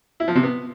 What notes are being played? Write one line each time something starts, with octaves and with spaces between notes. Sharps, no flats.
E4
F3
C3
B3